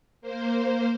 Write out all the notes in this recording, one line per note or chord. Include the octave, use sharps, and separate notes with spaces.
A#3 C5